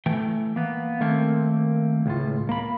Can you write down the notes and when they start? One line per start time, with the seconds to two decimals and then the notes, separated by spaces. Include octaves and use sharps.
0.06 E3 A3 G5
0.56 A#3 B3
1.00 D#3 A3 A#3 C4
2.06 C#2 A2 F4
2.49 A#3 B5